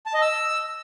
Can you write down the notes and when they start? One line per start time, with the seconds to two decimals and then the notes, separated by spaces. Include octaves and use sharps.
0.06 A5
0.14 D#5
0.22 E6